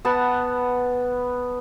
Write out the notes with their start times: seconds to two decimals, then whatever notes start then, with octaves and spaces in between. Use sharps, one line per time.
0.05 B3 F#5 A5 B5